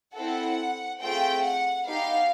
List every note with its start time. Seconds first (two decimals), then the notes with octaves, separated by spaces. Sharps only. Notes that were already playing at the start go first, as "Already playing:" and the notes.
0.16 C4 E4 A4 F#5
1.01 A3 C4 F4 G#4 G5
1.44 F#5
1.86 B3 D#4 G4 F5